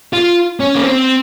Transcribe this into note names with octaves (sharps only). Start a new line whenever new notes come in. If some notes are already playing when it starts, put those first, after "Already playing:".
F4
C#4
A#3
C4